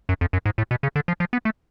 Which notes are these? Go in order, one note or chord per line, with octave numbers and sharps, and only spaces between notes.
F#2
F2
F#2
G#2
A2
B2
C#3
D3
F3
F3
B3
A3